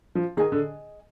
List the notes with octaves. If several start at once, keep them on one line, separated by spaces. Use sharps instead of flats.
F3
D#3 G#4 D#5 G#5
D3